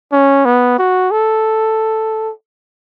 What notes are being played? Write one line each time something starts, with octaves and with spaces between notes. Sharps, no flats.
C#4
B3
F#4
A4